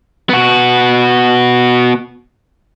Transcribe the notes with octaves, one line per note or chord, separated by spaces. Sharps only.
B3 F#4